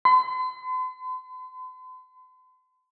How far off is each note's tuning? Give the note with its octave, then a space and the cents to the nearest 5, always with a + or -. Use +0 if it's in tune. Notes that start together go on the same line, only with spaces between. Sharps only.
C6 -45